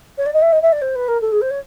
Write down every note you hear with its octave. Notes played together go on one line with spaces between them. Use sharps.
C#5
D5
D#5
E5
D#5
E5
D5
C5
B4
A#4
A4
G#4
C5
C#5